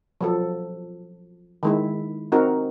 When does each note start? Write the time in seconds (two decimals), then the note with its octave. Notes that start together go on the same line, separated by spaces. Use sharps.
0.21 F3 F#3 A4
1.63 D#3 G#3 E4
2.32 C4 D#4 F#4 A#4